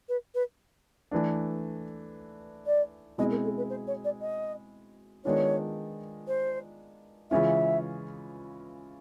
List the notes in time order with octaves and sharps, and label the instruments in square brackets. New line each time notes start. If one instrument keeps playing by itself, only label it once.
[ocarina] B4
B4
[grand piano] E3 A3 D4
[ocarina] D5
[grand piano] B2 G#3 C4 E4 G#4 [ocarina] D#5
[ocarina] A#4
A4
B4
C5
C#5
D5
D#5
[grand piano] D#3 G#3 B3 D4 F4 [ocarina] C#5
[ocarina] C5
[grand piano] C#3 E3 G#3 C#4 F4 [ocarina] E5